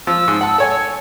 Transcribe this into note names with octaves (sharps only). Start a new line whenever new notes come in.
F3 E6
G#2
F#5 A5
A4 C#5 G#5